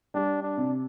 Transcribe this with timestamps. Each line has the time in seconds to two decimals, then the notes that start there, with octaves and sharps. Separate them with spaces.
0.14 G3 D4
0.43 D4
0.57 C3